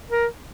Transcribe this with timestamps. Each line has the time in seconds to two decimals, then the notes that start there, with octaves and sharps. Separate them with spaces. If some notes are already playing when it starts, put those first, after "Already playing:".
0.10 A#4